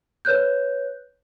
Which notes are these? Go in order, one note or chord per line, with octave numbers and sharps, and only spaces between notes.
B4 C#5 F#6 G6